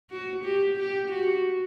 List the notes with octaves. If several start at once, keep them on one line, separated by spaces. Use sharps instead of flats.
F#4
G4
G4
F#4